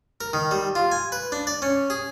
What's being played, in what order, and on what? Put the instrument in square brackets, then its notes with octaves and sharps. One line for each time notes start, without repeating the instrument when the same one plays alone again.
[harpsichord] A#4
D#3
G3
F4
G#5
B4
D4
D5
C#4
G#4